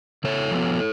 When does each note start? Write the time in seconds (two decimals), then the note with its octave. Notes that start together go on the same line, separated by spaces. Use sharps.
0.24 C#3 A4 C#5
0.51 F3 B3